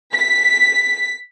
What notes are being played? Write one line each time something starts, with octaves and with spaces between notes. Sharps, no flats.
B6